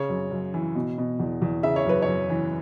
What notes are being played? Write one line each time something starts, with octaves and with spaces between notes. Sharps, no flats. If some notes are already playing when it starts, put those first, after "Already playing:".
Already playing: C#3 C#5
F#2
F#2
E3
B2
B2
E2
E2
C#3 E5
C#5
F#2 B4
C#5
F#2
E3